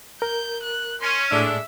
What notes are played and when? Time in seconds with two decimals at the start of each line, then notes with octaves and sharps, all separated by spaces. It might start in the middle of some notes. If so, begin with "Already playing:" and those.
0.22 A#4 G6
0.63 F#6
1.01 C#4 C6
1.31 A2 G#3 A3 D4 E5 E6